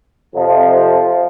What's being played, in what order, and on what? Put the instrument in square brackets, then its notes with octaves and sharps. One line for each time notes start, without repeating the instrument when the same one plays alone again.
[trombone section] F2 C3 F3